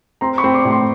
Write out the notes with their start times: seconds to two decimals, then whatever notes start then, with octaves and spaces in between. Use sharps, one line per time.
0.21 C4 A#5 C6
0.38 B5 C#6
0.44 C4
0.54 C6 D6
0.65 A2
0.71 C6 D6